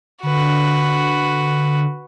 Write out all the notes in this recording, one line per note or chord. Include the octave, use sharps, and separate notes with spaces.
D3 F#4 B4